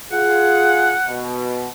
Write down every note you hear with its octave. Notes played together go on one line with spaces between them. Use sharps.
F4 G#4 F#5
B2